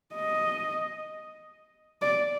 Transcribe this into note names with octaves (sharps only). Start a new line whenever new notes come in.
D#5
D5